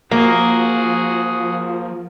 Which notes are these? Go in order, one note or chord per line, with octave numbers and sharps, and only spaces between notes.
F3 A#3 F#4 G#4